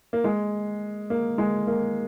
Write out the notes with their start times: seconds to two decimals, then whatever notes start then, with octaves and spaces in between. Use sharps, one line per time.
0.13 A#3
0.24 G#3
1.10 A#3
1.38 G#3
1.67 A#3